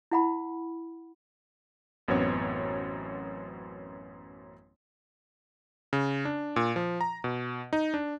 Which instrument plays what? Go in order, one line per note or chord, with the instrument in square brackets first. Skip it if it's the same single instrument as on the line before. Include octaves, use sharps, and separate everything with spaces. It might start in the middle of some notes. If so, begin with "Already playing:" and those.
[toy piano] E4 F#5 B5
[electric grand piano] A1 F#2 B3 C4 C#5
C#3
D4
A#2
F3
A#5
B2
D#4
D4